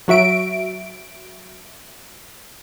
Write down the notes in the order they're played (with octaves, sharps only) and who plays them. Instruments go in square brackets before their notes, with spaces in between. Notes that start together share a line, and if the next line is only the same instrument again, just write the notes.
[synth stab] F#3 F#4 E5 D7